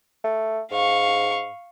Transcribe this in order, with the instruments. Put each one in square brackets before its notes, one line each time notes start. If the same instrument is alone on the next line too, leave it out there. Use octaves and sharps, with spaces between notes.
[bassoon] A3
[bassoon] G#2 [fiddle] F5 C#6